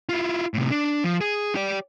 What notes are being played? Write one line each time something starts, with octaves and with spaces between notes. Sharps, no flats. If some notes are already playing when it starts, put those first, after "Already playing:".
E4 F4
A2 C3
D4
F3
G#4
G4 D5